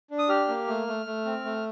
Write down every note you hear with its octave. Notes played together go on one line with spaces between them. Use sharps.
D4
D#6
G4 F6
A#3
A3
A3
A3
C4
A3